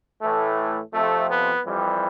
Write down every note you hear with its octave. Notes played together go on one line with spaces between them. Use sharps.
A2 E3 A3
F2 C3 F3 A3
B3
F2 E3 G3